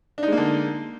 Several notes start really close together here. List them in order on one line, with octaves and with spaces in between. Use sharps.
D4 D#4 G#3 A#3 D3